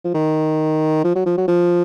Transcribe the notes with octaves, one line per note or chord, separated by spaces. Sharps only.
F3
D#3
F3
F#3
F3
F#3
F3